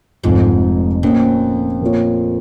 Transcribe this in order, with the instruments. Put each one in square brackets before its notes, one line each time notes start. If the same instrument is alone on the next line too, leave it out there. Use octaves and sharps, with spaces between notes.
[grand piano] F1 F2 F3 [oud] G#2
[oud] F2 [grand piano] A#2 A#3 C#4
[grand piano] A#2 A#3 F4 C#5